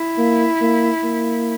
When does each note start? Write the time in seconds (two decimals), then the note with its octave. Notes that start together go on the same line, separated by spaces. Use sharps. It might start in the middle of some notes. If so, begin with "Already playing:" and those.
Already playing: E4
0.18 A#3
0.61 A#3
1.03 A#3